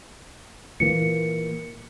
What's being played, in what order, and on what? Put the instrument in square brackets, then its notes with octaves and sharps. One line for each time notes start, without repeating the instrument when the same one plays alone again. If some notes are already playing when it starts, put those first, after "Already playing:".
[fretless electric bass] A#2 E3 A#3 [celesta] C#7